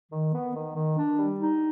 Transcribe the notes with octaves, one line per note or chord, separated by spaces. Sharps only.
D#3
B3
D#3
D#3
D4
G3
D#4